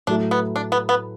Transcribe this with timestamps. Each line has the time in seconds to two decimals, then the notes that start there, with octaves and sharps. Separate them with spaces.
0.07 A2 F#3 A3 D4 E4
0.31 B3
0.56 D4
0.72 B3
0.89 B3